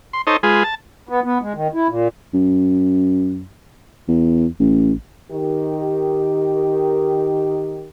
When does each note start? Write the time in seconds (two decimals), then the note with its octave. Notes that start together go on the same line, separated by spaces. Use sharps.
0.13 C6
0.27 D#4 A4 C5 C#5 D#5
0.43 G#3 F4 G#4 B4
0.64 A5
1.09 B3
1.24 B3
1.41 G#3
1.55 D#3
1.74 E4
1.89 A#2
2.34 F#2
4.08 E2
4.59 A1
5.31 D#3 G4